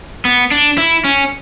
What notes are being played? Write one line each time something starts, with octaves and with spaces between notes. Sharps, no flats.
B3
D4
E4
C#4